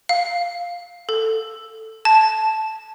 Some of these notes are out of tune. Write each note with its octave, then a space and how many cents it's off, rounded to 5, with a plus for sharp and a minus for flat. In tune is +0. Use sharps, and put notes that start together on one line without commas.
F5 +10
A4 +10
A5 -5